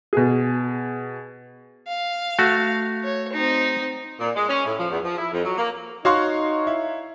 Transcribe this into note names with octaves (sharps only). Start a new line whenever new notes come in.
B2 G#4
F5
A3 F#4
C#5
C4 D#4
A#2
G#3
C#4
A2
F3
E2
F3
E4
F2
F#3
A#3
D#4 F#4 C#5 F5 C6 C#6
E4